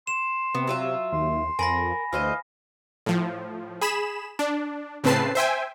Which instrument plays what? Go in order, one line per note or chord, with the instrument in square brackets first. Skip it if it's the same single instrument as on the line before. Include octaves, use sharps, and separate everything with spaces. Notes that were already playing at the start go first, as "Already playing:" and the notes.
[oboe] C6 [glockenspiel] E7
[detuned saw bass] C3 [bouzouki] B3
[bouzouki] F#3 F4 E5
[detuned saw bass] D#2 [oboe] C6
[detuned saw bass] F2 [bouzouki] A#4 [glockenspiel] G#5 B5 A#6
[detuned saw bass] D2 [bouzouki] E3 C5 D#5 [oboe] F5
[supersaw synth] A2 F3
G#4 B5 E7
D4
A2 C#3 C4 B4 A5 C7
C5 E5 G5 G#5